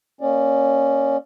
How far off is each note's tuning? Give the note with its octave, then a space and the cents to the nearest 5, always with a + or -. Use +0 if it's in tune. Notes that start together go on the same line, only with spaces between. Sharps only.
A#3 +0 C#4 -5 D5 +20